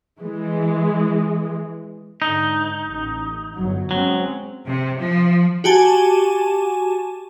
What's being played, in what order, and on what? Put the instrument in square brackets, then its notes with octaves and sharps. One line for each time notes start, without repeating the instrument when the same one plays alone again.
[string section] E3 G#3
[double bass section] G#2 D3 [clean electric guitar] D#4
[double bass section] A1
G1 F#3
[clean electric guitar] F#3 [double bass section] G#3 C4 C#4
[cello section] C3
F3
[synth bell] F#4 G4 G#5 A5